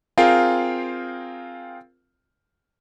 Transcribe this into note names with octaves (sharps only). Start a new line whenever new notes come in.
C4 F4 G#4 A#4 F5 G5